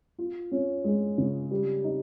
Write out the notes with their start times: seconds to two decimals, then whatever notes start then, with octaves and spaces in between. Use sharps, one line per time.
0.18 F4
0.52 C#4
0.84 G#3
1.18 C#3
1.51 G3
1.84 D#4